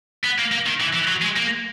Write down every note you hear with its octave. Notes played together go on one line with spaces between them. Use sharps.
B3
A#3
A#3
D#3
E3
E3
F#3
G#3
A#3